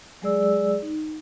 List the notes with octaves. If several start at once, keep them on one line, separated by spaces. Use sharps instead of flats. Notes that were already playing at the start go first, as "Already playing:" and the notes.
F#3 G#3 G#4 D5 E6
D#4